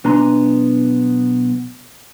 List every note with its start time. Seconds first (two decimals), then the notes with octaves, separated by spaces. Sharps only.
0.04 B1 B3 D4 G#5 A#5 C6